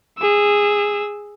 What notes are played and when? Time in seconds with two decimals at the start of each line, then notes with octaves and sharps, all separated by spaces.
0.18 G#4 E6